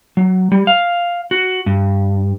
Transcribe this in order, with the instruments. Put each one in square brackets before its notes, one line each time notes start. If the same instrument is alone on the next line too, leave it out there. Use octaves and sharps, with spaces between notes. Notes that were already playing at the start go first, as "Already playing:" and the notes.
[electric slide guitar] F#3
G3
F5
F#4
G2